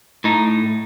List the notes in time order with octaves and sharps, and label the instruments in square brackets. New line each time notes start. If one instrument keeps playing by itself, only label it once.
[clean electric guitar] A2 D#4